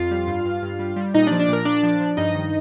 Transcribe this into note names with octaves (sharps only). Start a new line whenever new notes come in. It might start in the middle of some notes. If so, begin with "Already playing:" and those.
Already playing: F2 F4 F5
G3
G2
G2
G2
G3
G3
A#2 D#4 D#5
D4 D5
F3
D4 D5
A#2 A#4
A#2 D4 D5
F3
F3
G2 D#4 D#5
D#3